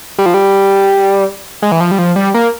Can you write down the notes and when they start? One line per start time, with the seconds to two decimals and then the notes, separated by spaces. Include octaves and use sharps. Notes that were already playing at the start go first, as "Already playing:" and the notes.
0.19 G3
0.26 F3
0.34 G3
1.62 G#3
1.72 E3
1.81 F3
1.91 G3
1.98 F3
2.16 G3
2.34 A#3